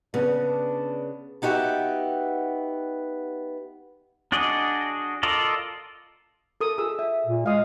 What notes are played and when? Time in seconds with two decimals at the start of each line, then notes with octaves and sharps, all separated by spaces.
0.14 C#3 B3 D4
1.42 B3 D#4 F#4 G4 E5
4.32 D4 F#4 G#4 D5 D#5
5.23 F4 A4 A#4 D5 D#5
6.61 A4 A#4 D#6
6.78 F4 G#4 E6
6.99 E5
7.27 A#2
7.46 G#3 F5 D#6